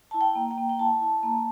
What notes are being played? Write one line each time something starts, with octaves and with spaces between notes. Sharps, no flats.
E4 A5
G5
A#3
G5
A#3
G5
E4 A5
E4
A#3